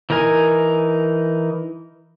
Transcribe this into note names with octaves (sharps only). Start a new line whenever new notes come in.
E3 D#4 A#4 G#5